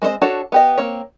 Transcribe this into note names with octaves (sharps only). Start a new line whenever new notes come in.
G#3 C4 D#4 C5 D#5
D4 F#4 A4 C#5
B3 G4 D#5
A#3 C4 C#5